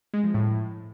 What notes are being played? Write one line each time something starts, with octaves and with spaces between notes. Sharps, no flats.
G#3
F3
A2